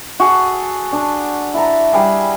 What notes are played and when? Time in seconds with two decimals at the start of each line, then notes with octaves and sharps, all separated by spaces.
0.20 F#4 G#4 A4
0.93 D4
1.54 E4 A5 A#5
1.92 G3 D4 G#4 G#5